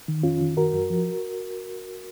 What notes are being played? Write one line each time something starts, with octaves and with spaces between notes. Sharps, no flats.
D#3
F2 C#4 F4
D#3
F#2 F#4 A#4
F#2
F3